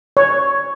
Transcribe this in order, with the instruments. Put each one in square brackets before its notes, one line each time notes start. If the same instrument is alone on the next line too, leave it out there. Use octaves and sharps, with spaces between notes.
[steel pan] C#5